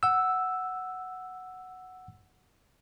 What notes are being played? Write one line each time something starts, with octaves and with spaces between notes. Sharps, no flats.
F#5 E6